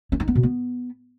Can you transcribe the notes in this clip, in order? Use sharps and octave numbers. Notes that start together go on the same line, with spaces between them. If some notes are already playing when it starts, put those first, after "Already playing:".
C#4
D#4
B3
B2
B3